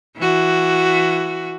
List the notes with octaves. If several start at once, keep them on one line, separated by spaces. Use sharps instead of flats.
E3 F#4